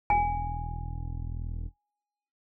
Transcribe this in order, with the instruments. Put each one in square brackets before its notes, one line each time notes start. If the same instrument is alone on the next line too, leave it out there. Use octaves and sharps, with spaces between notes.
[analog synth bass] E1 [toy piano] G#5